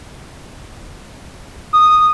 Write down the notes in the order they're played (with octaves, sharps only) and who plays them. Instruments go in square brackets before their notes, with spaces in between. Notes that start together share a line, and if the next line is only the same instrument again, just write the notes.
[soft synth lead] D#6